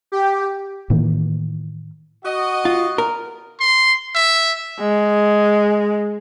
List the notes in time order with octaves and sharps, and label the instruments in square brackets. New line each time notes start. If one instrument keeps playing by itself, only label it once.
[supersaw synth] G4
[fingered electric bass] A2 D#3 E3 A#3
[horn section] F#4 D#5
[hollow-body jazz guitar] F4
A#4
[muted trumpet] C6
E5
[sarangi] G#3